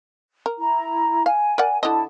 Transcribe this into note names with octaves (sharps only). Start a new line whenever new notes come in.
A#4
E4 A#5
F5 G#5
A#4 D5 F#5
D3 E4 D#5 A5